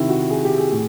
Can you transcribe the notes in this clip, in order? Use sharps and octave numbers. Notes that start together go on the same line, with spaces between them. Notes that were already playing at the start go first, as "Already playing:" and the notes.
Already playing: C3 D#3 E4
F#4
G#4
G4
G#4
A2